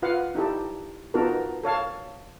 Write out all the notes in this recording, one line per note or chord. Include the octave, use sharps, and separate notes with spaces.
F4 B4 F5 F#5
D#4 E4 G4 A4
B3 D#4 F4 F#4 A4 A#4
A4 C#5 F5 A5